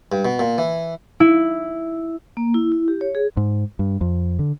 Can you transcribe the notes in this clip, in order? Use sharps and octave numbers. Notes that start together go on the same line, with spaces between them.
G2
B2
A#2
E3
E4
A#3
E4
E4
G4
C#5
G#4
G#2
G2
F2
D3